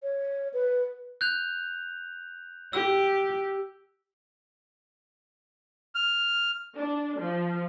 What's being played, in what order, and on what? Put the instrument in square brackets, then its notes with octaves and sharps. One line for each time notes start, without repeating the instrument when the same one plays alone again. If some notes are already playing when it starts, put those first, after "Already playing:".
[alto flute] C#5
B4
[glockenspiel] F#6 G6 F7
[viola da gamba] G4 [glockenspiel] E6
[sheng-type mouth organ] F6
[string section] D4
F3